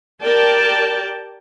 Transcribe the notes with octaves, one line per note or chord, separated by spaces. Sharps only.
G4 A#4 D5 G5 A5